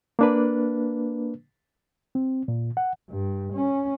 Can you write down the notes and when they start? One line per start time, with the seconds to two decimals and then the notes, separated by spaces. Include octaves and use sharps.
0.19 A#3 D4 B4
2.15 C4
2.48 A#2
2.77 F#5
3.10 G2
3.54 C#4